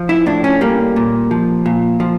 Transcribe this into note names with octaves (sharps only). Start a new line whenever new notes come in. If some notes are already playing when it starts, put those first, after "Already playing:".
Already playing: F3
E4
A2 D4
C#4
G3 A#3
A#2
F3
A#2
F3